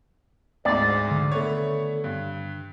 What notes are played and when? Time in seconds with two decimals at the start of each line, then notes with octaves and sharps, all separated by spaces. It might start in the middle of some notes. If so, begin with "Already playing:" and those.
0.65 D2 G#2 D5
1.11 D3
1.32 A3 B3 C#5
2.04 G2